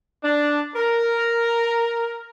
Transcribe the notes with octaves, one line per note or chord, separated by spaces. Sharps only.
D4
A#4